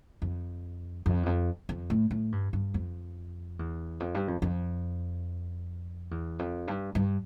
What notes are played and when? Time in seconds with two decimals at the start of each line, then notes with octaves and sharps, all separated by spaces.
0.22 F2
1.06 F2
1.23 E2
1.26 F2
1.69 F2
1.90 A2
2.11 A2
2.32 G2
2.53 G2
2.74 F2
3.59 E2
4.00 F2
4.15 G2
4.28 F2
4.42 F2
6.11 E2
6.39 F2
6.68 G2
6.95 G2